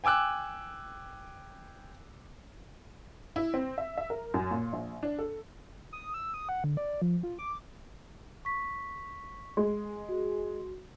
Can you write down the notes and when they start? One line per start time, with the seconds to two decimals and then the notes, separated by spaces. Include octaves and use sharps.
0.04 G5 G#5 D6 E6 F#6
3.36 E4
3.54 C4
3.78 E5
3.98 E5
4.10 A#4
4.34 F#2
4.51 A#2
4.73 A#1
5.03 D4
5.19 A4
5.93 D#6
6.14 E6
6.34 D#6
6.49 F#5
6.64 D3
6.77 D5
7.02 F3
7.23 F4
7.39 D6
8.45 C#6 B6
9.57 G#3
10.09 F#4